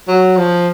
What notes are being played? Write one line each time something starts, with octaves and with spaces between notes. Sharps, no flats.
F#3
F3